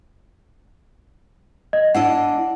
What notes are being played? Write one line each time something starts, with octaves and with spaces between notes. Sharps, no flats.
D#5
D4 E4 D#5 F#5